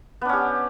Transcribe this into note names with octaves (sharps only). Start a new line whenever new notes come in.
B3 C#4 D4 G4